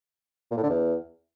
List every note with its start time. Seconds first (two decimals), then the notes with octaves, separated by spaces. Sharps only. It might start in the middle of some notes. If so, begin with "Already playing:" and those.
0.51 A#2
0.57 A2
0.63 D3
0.69 E2